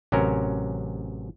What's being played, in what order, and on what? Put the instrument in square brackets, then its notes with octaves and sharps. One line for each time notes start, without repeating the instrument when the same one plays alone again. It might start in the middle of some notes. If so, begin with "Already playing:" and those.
[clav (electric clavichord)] A1 C3 F#3 C#4 A#4